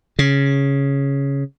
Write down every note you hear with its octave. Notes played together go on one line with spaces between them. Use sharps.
C#3